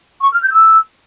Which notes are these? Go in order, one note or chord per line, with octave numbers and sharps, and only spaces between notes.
C#6
F6
G6
E6